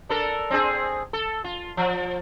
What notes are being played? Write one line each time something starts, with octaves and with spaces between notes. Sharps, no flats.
D4 A4 A#4
C4 D4 G#4
A4
F4
F3